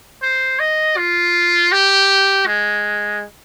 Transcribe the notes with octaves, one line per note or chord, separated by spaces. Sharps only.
C5
D#5
F4
G4
G#3